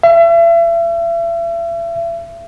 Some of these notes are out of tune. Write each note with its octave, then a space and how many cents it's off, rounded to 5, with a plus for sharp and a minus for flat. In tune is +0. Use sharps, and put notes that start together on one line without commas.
E5 +40